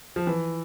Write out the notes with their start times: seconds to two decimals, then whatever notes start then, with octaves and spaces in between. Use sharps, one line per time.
0.16 F3
0.27 E3